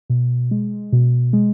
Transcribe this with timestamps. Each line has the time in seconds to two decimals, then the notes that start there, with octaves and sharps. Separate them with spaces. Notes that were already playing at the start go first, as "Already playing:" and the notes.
0.10 B2
0.51 G#3
0.93 B2
1.33 G#3